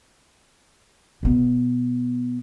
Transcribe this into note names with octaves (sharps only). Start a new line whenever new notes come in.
B2 B3